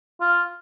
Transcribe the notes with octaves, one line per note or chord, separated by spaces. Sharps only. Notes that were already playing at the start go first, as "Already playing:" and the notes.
F4